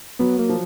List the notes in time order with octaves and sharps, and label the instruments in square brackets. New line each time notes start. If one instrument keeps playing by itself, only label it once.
[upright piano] F#3 [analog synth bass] B3
[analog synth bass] A#3
[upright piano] F3